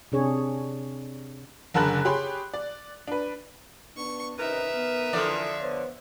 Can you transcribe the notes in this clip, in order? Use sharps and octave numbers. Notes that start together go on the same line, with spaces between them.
C3 D4 G#4 C#5
F#1 D3 A#4 A5 B5 F#6
G4 G#4 C#5 B5 C6
D5
D4 B4
B3 D4 C#6
C3 D#3 C#4 D#4 A#4 B4 E5
B3
D3 E3 F3 A4 D5
B3 C5 C#5